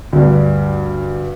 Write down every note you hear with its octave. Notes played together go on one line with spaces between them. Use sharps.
D2 G2